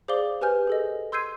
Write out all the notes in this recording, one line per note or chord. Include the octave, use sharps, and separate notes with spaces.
G#4 C5 D5 F5 D6 G7
G4 B4 C5 G#5 F6 G6
G#4 A4 D#5
C6 E6 G6 G#6 C7 D#7